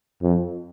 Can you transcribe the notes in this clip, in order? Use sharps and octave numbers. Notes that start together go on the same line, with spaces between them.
F2